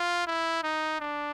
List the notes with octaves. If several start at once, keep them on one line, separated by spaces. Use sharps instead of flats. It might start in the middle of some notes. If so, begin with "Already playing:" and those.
Already playing: F4
E4
D#4
D4